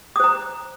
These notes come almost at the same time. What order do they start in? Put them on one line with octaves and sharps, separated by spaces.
D#6 C5 A#5